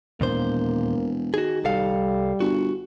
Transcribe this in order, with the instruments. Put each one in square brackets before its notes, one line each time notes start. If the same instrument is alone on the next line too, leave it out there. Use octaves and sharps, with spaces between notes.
[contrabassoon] E1 [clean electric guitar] D#2 A#2 C5 [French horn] A#3
[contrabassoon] D#3 [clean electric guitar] F#4 G#4
[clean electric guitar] C2 A4 F5 [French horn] G3
[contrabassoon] G1 [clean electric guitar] F#4